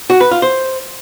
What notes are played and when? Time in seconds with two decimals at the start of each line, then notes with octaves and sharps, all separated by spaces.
0.10 F#4
0.21 B4
0.31 F4
0.42 C5